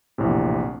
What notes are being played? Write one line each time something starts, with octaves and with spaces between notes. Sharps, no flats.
A#1 E2 A2 C3